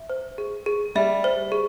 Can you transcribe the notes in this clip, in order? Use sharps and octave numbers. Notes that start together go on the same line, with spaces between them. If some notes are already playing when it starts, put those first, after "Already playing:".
Already playing: E5
C5
G#4
G#4
G3 E5
C5
G#4